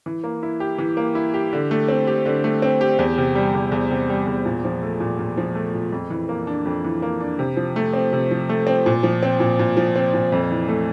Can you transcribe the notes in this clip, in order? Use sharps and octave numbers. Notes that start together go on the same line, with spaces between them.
E3
A#3
E4
G4
E3
A#3
E4
G4
D3
A3
C4
G4
D3
A3
C4
G4
E2
C3
G3
E2
E2
C3
G3
E2
A#2
F3
A3
A#2
A#2
F3
A3
A#2
F2
E3
A#3
D4
F2
E3
A#3
D4
C3
F3
A3
C4
C3
F3
A3
C4
A#2
F3
C4
A#2
A#2
F3
C4
A#2
F2
E3
A3